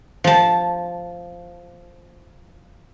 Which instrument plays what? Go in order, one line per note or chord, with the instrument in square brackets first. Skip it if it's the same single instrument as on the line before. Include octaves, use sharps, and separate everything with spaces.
[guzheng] F3 A5